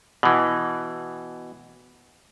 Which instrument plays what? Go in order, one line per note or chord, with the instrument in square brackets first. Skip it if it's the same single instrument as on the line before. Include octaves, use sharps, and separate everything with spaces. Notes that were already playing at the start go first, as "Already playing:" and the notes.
[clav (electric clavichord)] B2 E3